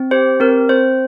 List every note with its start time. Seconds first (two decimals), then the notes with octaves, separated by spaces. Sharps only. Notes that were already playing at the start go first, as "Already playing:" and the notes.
Already playing: C4
0.11 G4 C5
0.40 C4 A#4
0.69 C4 C5